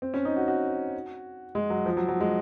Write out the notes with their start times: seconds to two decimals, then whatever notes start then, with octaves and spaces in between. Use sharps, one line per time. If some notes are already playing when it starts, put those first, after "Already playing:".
0.02 C4
0.14 C#4
0.25 D#4
0.37 F#4
0.48 F#4
1.55 G#3
1.70 F#3
1.86 F3
1.97 F#3
2.08 F#3
2.20 G#3